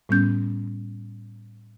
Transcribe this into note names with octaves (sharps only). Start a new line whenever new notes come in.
A2 G3 B3 C#4 G6